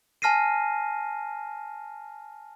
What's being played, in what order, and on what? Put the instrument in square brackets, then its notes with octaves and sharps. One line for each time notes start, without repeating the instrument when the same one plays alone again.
[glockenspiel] G#5 A5 F6 A#6 C7 D#7